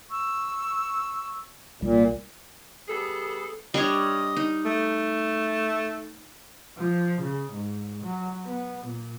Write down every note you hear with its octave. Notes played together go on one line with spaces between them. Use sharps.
C#6 E6
C2 A#2 G3
G3 B3 G#4 A4
G3 D4 C#5 D#5
D#4
A3
F3
C#3
G#2
F#3
B3
A#2